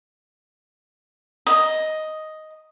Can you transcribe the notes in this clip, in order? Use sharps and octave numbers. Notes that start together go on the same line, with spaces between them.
D#5